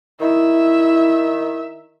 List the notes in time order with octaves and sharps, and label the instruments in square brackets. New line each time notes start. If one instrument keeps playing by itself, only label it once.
[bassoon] D#3 [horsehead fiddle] E4 [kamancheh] E5